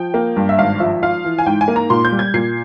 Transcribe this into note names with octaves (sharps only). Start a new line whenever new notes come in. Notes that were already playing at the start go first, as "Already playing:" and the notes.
Already playing: F3 G5
A#3
G2
E5
G#1 F5
F3 E5
F4 F5
E3
G#5
G#2 G5
G#5
A#3
A#5
A#2 C6
G6
G3
G#6
A#2 C7